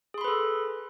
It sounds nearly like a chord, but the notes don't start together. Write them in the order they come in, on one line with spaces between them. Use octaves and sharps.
G#4 C6 B5 B4 A4